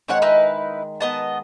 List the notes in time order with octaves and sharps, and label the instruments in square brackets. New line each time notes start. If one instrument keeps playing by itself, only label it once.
[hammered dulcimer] D#3 G#3 [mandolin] C4 C#5 F#5
[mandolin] D#4 E4 B4
B3 D#5 A5